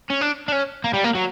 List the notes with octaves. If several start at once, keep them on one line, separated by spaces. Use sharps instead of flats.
C#4
D4
D4
C#4
A#3
G3
A#3
F#3